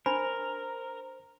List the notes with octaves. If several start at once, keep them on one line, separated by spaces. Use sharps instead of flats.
D4 A#4 C5 B5